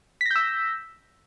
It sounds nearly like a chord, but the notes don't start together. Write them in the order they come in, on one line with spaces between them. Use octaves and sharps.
B6 A#6 G6 E6